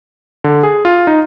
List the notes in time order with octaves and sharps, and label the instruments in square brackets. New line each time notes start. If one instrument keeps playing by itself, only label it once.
[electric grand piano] D3
G#4
F4
D#4